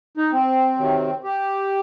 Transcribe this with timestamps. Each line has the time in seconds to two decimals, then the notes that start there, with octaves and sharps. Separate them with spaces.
0.17 D#4
0.32 C4
0.78 C3 D#3 F#3
1.24 G4